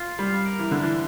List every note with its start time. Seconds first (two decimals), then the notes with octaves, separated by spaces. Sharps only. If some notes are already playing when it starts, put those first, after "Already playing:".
Already playing: F4
0.19 G3 F5
0.46 A#4
0.59 E3
0.71 D3 D4
0.83 E3